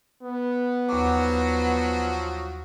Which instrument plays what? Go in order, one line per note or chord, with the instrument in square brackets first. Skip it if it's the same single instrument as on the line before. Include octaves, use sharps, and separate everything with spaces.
[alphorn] B3
[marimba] D#2 D6 [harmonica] F3 F#3 F#4